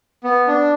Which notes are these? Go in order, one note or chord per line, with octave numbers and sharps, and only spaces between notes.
B3
D4